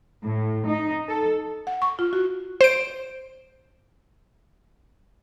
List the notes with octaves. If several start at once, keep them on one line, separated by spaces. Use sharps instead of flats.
A2
D#4
A4
F#5
C#6
F4
F#4
C5 D7